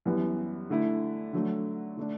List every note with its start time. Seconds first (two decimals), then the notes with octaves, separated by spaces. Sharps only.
0.05 F#2 E3 G3 B3
0.70 D3 A3 E4
1.33 D3 F#3 A3
1.97 D3 A3 D4